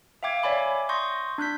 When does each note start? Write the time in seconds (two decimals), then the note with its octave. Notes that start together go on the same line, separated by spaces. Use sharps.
0.23 E5 F5 G5 D6 G#6
0.43 C#5 D5 E5 G#5 B5 D6
0.89 C6 C#6 D#6 G6 A#6
1.38 D4 F#6 G6 B6